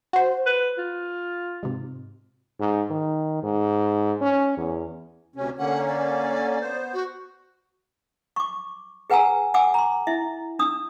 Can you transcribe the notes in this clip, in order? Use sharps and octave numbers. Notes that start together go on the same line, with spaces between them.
F#4 C5
B4
F4
G#2 C3
G#2
D#3
G#2
C#4
E2
D2 C3 C#4
D3 A#3 C#4 F#5
D5
B3 C5
F#4
C#6 D6
G#4 B4 F#5 G#5 A#5 E6
F#5 G#5 D6 E6
A#5 C6
E4 E5
D4 D#6 E6